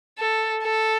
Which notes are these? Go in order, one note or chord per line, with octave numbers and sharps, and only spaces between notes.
A4
A4